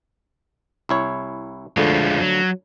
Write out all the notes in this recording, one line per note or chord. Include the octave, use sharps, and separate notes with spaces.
C2 E4 C#5
D2 D3 F3 G#3 A3 F4
F#3